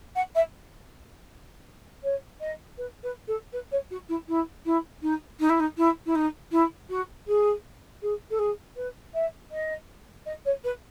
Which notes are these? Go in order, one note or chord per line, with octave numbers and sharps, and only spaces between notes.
F#5
E5
C#5
D#5
B4
B4
A4
B4
C#5
F#4
E4
E4
E4
D#4
D#4
E4
D#4
E4
E4
D#4
E4
F#4
G#4
G#4
A4
G#4
B4
E5
D#5
D#5
C#5
B4